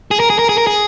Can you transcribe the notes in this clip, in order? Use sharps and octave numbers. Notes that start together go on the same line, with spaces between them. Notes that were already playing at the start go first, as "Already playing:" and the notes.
G#4
A#4
G#4
A#4
G#4
A#4
G#4